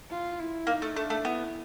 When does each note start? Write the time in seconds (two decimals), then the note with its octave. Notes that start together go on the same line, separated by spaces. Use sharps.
0.11 F4
0.39 E4
0.67 A#3 D#4
0.82 A3
0.95 A3 D4
1.10 A3
1.25 B3 E4